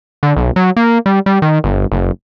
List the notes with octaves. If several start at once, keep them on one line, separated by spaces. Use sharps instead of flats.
D3
B1
F#3
A#3
G3
G3
D#3
G1
F#1